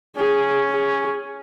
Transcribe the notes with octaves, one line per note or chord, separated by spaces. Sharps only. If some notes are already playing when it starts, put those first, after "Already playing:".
C#4 G#4
G#4